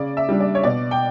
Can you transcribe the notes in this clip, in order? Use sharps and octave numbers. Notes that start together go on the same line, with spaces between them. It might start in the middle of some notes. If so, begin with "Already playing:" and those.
Already playing: C#3 D5
E5
G3 D4
D5
C#5
B2 D5
G5